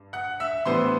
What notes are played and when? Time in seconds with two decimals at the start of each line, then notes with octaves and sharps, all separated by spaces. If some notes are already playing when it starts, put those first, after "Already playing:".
Already playing: G2
0.13 F#5 F#6
0.40 E5 E6
0.65 A2 E3 G3 B3 D4 C5 C6